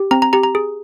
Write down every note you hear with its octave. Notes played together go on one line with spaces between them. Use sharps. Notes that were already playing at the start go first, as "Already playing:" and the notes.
Already playing: G4
C4 A#5
A#5
G4 A#5
A#5
G#4